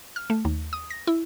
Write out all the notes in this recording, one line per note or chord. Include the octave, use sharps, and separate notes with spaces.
F6
A3
D#2
D#6
A#6
E4